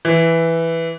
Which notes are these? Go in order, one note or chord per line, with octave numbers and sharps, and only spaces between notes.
E3